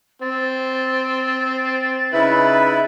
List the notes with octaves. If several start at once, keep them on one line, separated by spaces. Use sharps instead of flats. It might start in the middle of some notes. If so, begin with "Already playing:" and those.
C4 A6
C#3 D#4 E4 B4 E5